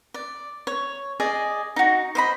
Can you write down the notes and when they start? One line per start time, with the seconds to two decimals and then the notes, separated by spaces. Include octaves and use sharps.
0.14 D5
0.67 C#5
1.20 G#4 D5 D#5
1.76 D#4 F#4
2.15 C5 D#5 B5